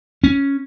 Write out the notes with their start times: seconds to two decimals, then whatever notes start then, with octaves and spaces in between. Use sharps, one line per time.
0.24 C#4